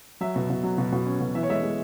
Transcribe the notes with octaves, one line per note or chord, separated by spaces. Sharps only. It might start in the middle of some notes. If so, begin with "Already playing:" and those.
F#3 E5
B2
B2
F#3
B2
B2
C#4
B2
E3 E5
C#5
G#3 E5
G#3